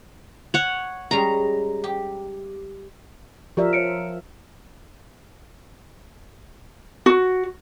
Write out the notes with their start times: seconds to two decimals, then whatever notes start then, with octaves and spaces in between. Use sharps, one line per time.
0.54 C#5 F#5
1.11 G3 G#3 C#4 A#5
1.84 G4
3.57 F3 G4 A#4 D5 E5
3.73 C#5 C#7 D7
7.06 F#4